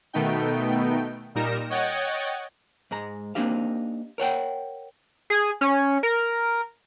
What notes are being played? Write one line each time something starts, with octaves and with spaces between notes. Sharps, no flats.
B2 D#3 A3 B3 D#4 G5
A#2 G3 D#4 A#4 A#6 E7
C#5 D#5 F#5 G5 G#6 A6
G#2 G#3 A#5
A#3 C4 D4 D#4 G4 F5
A#4 C#5 F#5 G5
G#4
C#4
A#4